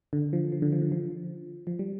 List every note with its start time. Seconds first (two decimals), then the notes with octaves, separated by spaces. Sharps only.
0.13 D3
0.33 F3
0.52 F3
0.62 D3
0.72 F3
0.82 D3
0.92 F3
1.67 F3
1.79 G3